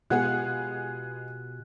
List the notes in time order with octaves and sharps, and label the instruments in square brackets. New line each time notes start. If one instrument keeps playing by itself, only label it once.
[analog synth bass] B2 [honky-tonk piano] G#3 B3 G#4 [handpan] F4 G4 F#5 [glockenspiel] F#6